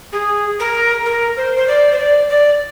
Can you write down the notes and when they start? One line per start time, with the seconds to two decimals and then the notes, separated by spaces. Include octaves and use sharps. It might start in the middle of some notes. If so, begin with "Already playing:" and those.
0.12 G#4
0.59 A#4
1.05 A#4
1.36 C5
1.56 C5
1.67 D5
1.91 C5
1.97 D5
2.29 D5